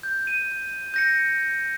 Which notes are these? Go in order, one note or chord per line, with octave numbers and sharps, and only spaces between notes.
G6
D#7
G6 A#6 C#7